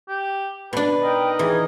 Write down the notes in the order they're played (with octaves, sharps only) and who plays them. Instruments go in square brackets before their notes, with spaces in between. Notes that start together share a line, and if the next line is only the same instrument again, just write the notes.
[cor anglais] G4
[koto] B2 D4 [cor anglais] B4
[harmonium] D#4 A#4 D#5 [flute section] G5
[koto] E3 [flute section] G#4